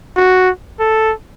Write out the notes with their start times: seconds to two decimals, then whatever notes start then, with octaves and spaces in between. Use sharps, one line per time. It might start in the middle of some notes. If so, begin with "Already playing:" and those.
0.16 F#4
0.79 A4